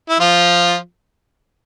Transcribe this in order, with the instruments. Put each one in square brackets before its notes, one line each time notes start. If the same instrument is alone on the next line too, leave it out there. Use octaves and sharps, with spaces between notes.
[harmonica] E4
F3 F4